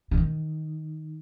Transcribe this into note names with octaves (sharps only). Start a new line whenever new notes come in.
D3
D#3